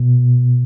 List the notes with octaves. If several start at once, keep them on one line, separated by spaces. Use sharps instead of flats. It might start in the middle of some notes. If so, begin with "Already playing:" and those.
Already playing: B2